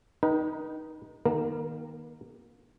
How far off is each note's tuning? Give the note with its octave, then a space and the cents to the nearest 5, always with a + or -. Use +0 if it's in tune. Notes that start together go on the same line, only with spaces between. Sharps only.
D#4 +0 B4 -45 G5 -25
D#3 +0 A#3 +35 A#4 -10